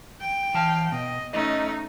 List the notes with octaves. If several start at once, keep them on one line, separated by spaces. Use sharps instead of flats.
G5
E3 F5 A5
B2 D#5
A3 C#4 D#4 D#5